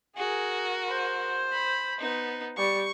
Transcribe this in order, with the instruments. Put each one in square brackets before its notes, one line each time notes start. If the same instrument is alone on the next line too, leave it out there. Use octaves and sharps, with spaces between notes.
[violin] F#4 A#4 [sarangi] G#4
[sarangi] C5
[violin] B5
B3 D#4
[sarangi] G3 [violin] C#6